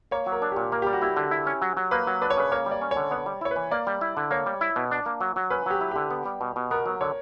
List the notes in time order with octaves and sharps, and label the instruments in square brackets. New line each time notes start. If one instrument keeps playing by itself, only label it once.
[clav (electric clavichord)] A#3 [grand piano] C#5
[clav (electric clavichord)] F#3
[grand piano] A#4
[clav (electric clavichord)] D4
[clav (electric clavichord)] A#2 [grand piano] G4
[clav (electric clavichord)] A#3 [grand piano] A#4
[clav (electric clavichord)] G3 [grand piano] G4
[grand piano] F#4
[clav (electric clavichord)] E4 [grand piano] G4
[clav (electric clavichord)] D3
E4
C#4
F#3
F#3
[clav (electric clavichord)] A#3 [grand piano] B4
[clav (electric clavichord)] F#3
[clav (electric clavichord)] D4 [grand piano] B4
[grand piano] C#5
[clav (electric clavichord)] C#3 [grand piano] B4
[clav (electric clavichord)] A#3 [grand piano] C#5
[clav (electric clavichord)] G3
[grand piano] D5
[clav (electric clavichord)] C#4
[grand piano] C#5
[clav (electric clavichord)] D3
[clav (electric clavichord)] B3 [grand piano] C#5
[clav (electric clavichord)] G3
[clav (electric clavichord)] E4 [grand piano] C#5
[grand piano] B4
[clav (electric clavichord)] E3
[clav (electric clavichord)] A#3 [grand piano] D5
[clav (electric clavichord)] G3
E4
D3
[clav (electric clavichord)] A#3 [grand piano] C#5
[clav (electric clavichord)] G3
E4
B2
D4
A#3
F#3
F#3
[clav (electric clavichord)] C#4 [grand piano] B4
[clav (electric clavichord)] F#3 [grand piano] G4
[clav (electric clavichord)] E4
[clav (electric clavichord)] D3 [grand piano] G4
[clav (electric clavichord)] B3
G3
B2
B2
[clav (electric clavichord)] B3 [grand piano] A#4
[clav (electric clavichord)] F#3
[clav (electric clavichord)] D3 [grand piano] C#5